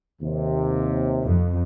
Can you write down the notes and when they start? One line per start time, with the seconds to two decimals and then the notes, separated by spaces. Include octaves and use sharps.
0.21 D#2 C3
1.24 F2